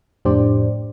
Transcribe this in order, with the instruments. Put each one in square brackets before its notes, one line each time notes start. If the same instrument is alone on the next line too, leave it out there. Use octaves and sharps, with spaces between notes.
[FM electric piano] F2 A2 D4 G4 C5 D5